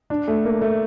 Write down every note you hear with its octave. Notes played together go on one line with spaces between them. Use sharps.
D4
A3
A#3
A3